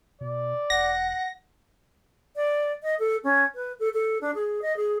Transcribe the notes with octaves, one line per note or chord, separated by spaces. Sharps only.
B2 D5
E1 F#5 A#6
D5
D#5
A4
C#4
B4
A4
A4
D4
G#4
D#5
G#4